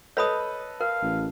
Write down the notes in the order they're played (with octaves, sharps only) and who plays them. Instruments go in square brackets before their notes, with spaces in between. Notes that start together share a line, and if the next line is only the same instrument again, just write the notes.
[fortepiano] A4 B4 D#5 [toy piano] C#5 B5 D#6
[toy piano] A#4 [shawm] F5
[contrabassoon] A1